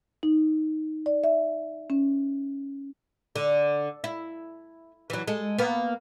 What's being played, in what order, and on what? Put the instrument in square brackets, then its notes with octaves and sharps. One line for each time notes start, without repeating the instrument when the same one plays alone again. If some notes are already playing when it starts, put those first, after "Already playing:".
[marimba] D#4
D5
E5
C#4
[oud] D3
E4
E3 F#3
G#3 A4
A#3 B3